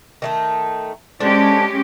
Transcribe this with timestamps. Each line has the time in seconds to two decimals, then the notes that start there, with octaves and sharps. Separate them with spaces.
0.22 D#3 A3 D#4
1.20 G#3 C#4 D4 G4 A4 C5